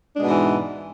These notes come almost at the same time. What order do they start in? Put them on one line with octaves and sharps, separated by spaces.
D4 G#3 B2 G#2 E3